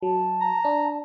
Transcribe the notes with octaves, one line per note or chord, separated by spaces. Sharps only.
F#3 A5
A#5
D4